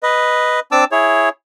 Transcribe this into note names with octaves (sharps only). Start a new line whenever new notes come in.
B4 D#5
C4 D4 A5 D6 E6
E4 G#4 C#5